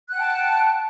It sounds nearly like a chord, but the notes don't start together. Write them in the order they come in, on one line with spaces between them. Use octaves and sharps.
F#6 F#5 G5 A5